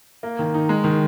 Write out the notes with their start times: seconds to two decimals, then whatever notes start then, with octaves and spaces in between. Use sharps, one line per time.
0.23 A#3
0.39 D#3
0.54 D#4
0.69 G#3
0.84 D#3